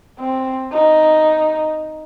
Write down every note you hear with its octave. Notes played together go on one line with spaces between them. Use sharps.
C4
D#4